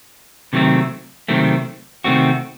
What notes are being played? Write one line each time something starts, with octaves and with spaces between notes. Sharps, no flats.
C3 D#3 F#3 A3 C4
C3 D#3 F#3 A3 C4
C3 D#3 A3 C4 F#4